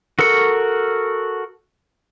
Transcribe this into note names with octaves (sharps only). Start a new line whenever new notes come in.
F#4 A4 A#4 C#6